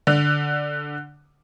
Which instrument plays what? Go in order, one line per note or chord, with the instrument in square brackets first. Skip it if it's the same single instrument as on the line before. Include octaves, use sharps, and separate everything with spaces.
[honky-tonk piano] D3